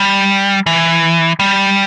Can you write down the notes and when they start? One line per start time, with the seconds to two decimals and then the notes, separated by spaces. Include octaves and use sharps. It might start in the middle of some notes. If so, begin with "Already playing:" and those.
Already playing: G3
0.66 E3
1.39 G3